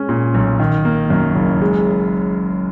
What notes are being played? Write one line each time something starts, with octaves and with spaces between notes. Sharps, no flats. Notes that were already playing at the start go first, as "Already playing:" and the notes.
Already playing: G#3 C#4
A#2
B1
D#3
A#3
F#2
F#1
G#3